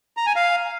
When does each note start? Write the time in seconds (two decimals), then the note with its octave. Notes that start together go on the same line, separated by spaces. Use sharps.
0.17 A#5
0.26 G#5
0.36 F5